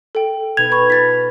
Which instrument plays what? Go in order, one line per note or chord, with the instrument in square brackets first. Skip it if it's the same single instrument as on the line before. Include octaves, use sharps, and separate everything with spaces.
[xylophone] A4 G5
[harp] B2 D#4 B4 [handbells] G#6 [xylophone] F7
[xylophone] B5 C#6
[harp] F4 A4 [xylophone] B5 A6 B6